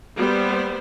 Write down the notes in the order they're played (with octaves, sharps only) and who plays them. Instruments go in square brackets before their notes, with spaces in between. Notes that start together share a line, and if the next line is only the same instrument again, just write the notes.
[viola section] G3 A#3 B3 C5